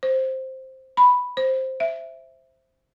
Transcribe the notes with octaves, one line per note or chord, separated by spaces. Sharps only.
C5
B5
C5
E5